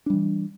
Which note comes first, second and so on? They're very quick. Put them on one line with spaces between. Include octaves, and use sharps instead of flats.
D4 G3 E3